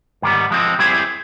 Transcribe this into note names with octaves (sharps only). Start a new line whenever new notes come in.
G#2 D#3 G3 B3
F3 G#3 C4
G3 C4 E4 G#4 C5